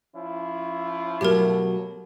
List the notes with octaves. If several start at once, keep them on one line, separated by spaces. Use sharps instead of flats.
F3 C#4 E4
B2 F#3 A3 G4 A#4